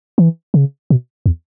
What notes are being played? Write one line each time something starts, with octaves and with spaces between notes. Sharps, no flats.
E3
C#3
B2
E2